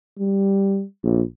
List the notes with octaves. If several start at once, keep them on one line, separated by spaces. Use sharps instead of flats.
G3
A#1